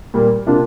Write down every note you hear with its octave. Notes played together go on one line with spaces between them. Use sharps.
A#2 G3 A#3
C3 A#3 D4 F4